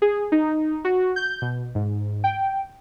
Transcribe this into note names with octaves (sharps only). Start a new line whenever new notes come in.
G#4
D#4
F#4
G6
B2
G#2
G5